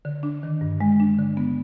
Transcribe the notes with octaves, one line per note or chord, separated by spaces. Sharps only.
D3
D4
D#3
G2
G#3
D4
D3
B3